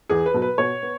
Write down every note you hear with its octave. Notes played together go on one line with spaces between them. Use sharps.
E2 G#4
B4
B2 F#3
B4
B2 C#5
B3